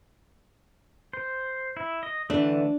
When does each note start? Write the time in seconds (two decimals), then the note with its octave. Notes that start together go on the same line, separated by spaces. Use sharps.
1.13 C5
1.77 E4
2.03 D#5
2.30 D3 E3 A3 D4